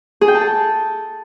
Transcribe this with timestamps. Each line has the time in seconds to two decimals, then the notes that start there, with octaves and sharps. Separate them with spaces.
0.21 G#4
0.28 G5
0.35 A5
0.41 A4